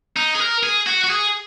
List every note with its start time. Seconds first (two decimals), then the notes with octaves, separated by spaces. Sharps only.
0.17 D#4
0.35 G#4
0.40 A#4
0.63 G#4
0.87 F#4
1.04 F#4
1.10 G#4